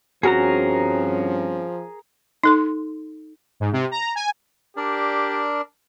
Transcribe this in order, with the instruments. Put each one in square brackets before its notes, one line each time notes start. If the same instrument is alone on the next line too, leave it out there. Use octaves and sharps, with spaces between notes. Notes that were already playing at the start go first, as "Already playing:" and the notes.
[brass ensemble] G2 C4 C#4 [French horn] F3 [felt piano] F#4 [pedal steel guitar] G#4 A#4 A#5
[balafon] D#4 A4 C6
[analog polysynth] G#2
C3
A#5
G#5
[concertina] D4 A#4 D5 [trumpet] G4